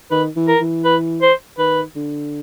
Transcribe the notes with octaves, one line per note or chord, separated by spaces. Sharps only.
D#3 B4
E3
A#4
E3
B4
C5
D#3 B4
D3